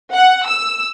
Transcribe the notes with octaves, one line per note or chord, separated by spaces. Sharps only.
F#5
E6